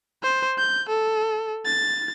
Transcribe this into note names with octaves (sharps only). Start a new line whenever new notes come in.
C5
G6
A4
A6